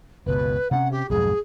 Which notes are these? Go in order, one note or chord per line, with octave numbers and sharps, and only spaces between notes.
F#1 C#2 B2 B4
C3 C4 C#4 F#5
G4
B1 F2 G#2 G#4